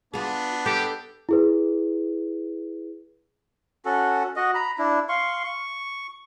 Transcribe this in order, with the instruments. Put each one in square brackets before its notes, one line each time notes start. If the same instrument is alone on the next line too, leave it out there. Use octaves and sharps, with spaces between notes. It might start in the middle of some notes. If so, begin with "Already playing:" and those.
[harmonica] B3 D4 [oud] F4 G#4
[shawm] G4 [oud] A4
[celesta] E4 G#4 B4
[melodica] C#4 F#4 A4
F#4 D#5
A#5 B5
D4 E4
F5 C6 C#6
C#6